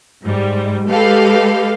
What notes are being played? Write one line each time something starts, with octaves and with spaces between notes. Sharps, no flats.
G#2 G3
G#3 G4 A4 B4 F5